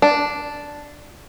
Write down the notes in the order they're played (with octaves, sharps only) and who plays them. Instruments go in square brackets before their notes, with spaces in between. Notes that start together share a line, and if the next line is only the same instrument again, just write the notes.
[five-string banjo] D4